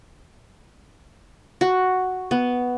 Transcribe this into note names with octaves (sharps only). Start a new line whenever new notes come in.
F#4
B3